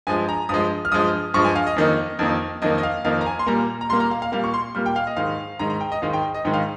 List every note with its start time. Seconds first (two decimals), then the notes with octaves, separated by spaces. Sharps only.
0.07 G2 F3 G#3 G#5
0.29 A#5
0.49 G2 F3 G#3 D#6
0.85 F6
0.92 G2 F3 G#3 D#6
1.34 G2 F3 G#3 C#6
1.45 G#5
1.56 F5
1.67 D#5
1.76 F2 D#3 A#3
2.19 F2 D#3 A#3
2.62 F2 D#3 A#3 D#5
2.78 D#5
2.83 F5
3.05 F2 D#3 A#3 F5
3.21 A#5
3.26 G#5
3.39 C6
3.46 A#2 G3 A#3 A#5
3.81 A#5
3.89 A#2 G3 A#3 C6
4.00 A#5
4.11 F5
4.22 F5
4.32 A#2 G3 A#3 F5
4.44 C#6
4.54 C6
4.75 A#2 G3 A#3 F6
4.86 G5
4.96 F5
5.07 D#5
5.17 G#2 D#3 G#3 F5
5.59 G#2 D#3 G#3 A#5
5.70 A#5
5.81 G5
5.92 D#5
6.02 G#2 D#3 G#3 F5
6.13 G5
6.35 D#5
6.45 G#2 D#3 G#3 G5
6.54 F5